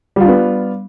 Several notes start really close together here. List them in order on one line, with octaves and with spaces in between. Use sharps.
G3 F4 D4 B3